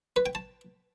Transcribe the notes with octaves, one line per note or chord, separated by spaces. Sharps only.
B4
G5
A5